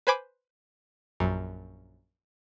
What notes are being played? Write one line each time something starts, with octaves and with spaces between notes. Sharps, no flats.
B4 C5 G#5 B5 D6
A#1 F#2